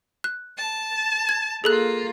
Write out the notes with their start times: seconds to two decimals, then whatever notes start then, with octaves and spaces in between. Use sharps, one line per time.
0.24 F#6
0.57 A5
1.29 G#6
1.64 A#3 F4 G#4 A4 F#6